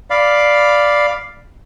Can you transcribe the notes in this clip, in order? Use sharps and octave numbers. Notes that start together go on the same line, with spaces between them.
D5 F5 B5